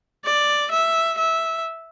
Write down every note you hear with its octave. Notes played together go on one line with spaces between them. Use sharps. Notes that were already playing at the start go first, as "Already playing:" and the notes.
D5
E5
E5